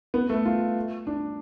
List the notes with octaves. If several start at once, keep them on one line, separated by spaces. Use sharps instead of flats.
B3
A3
F4
D4